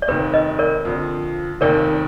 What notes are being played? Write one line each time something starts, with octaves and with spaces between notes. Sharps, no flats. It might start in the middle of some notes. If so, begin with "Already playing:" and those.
D5
F1 D#2 D#3 B4
B4 D#5
A#4 D5
F2 D3 F3
F1 D#2 D#3 A#4 D5